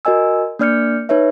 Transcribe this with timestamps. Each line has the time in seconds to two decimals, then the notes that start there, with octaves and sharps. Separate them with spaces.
0.05 F#4 A#4 D#5 G#5 E6
0.59 A#3 D4 D5 F6 G6 C#7
1.09 D#4 B4 C#5 E5